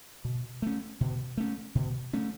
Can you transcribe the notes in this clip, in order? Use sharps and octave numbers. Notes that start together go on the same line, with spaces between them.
B2
A3 C#4
B2
A3 C#4
B2
A3 C#4